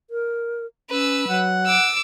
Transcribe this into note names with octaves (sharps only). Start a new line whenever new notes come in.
A#4
C#4 B4 E6
F#3 F#5
D6 E6